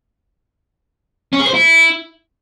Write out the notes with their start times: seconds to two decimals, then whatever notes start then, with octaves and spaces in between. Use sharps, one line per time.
1.33 C#4
1.40 G#4
1.47 C5
1.54 E4